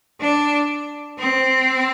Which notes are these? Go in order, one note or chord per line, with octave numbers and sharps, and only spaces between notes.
D4
C4